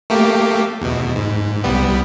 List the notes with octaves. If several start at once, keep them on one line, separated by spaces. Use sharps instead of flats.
A3 A#3 G4
E2 B2
G#2
C2 G3 B3